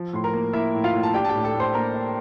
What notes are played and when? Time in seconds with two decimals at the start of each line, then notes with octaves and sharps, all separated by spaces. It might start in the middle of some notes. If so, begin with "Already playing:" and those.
Already playing: F3
0.13 A2 C6
0.24 A#4 A#5
0.34 A#3
0.53 A#3 E4 E5
0.74 A2
0.84 F4 F5
0.93 A2
1.03 A5
1.14 D4 G4 G5
1.24 A5
1.29 G4 G5
1.35 A2
1.44 A4 A5
1.54 A2
1.60 C5 C6
1.74 A#3 A#4 A#5
1.94 D4